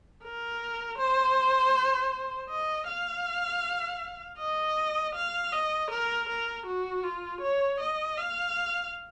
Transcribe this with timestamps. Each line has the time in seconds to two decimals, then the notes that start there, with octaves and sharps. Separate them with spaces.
0.23 A#4
0.98 C5
2.50 D#5
2.87 F5
4.38 D#5
5.15 F5
5.52 D#5
5.91 A#4
6.29 A#4
6.67 F#4
7.04 F4
7.41 C#5
7.80 D#5
8.17 F5